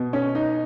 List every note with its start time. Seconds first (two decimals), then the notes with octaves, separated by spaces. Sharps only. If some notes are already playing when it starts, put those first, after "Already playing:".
Already playing: B2
0.13 C#4
0.35 D#4